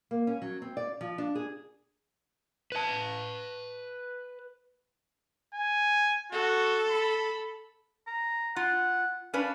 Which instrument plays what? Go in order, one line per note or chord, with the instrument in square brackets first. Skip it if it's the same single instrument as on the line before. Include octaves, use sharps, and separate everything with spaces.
[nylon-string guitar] A#3
C#4
F#3
C4
D5
F3
D4
G#4
[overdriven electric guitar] B4 A5
[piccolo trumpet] G#5
[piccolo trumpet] F#4 [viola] A4
[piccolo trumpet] B5
[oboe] A#5
[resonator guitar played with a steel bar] F4 [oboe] F#5
[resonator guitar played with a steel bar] C#4 D4 B4 [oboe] F5